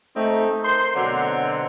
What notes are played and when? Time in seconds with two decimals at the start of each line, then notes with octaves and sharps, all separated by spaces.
0.16 A3 C4 D#4
0.64 A#4 C5 C6
0.96 B2 D3 F#3 C4